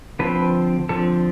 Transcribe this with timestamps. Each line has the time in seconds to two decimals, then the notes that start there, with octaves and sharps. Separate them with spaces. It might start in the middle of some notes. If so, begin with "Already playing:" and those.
0.19 D3 F3 C4 B4
0.89 D3 F3 C4 A4